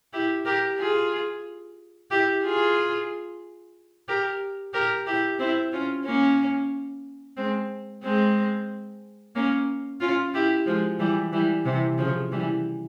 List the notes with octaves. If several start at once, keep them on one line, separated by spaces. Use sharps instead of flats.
E4 G4
G4 A#4
F4 G#4
E4 G4
F4 G#4
G4 A#4
G4 A#4
E4 G4
C4 E4
C#4 F4
A#3 C#4
G#3 C4
G#3 C4
A#3 C#4
C#4 F4
E4 G4
F3 G#3
E3 G3
E3 G3
C3 E3
C#3 F3
E3 G3